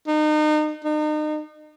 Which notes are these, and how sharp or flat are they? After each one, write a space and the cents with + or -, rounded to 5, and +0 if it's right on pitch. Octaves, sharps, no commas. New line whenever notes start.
D#4 -35
D#4 -35